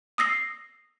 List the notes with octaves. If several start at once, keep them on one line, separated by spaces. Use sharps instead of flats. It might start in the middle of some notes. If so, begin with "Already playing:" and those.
D#6 E6 A#6 C7